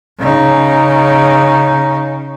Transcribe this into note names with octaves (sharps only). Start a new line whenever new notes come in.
C#3 D#4